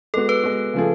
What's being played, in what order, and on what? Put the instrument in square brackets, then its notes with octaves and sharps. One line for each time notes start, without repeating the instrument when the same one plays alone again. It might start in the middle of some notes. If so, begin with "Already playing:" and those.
[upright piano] G#3 B3 F#4 [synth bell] A4
[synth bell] B4
[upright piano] G#3 B3 F#4
C#3 F3 A3 F4 G#4